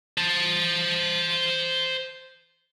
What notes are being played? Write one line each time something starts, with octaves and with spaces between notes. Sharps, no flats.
C5 A5